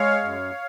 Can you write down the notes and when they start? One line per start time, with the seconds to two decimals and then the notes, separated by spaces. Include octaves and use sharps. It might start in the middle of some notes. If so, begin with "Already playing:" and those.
Already playing: G#3 C#5 F5
0.24 F#2